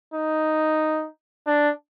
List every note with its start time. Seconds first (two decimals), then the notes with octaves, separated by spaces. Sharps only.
0.14 D#4
1.47 D4